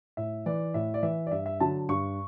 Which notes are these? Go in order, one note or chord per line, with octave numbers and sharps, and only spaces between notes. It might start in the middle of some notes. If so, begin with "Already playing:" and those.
A2 E5
E3 D5
A2 E5
D5
E3 E5
D5
G2 E5
E5
D3 F#3 A5
G2 C#6